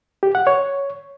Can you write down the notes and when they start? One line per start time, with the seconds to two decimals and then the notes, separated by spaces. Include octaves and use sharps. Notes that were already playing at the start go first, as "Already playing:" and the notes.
0.23 G4
0.35 F#5
0.47 C#5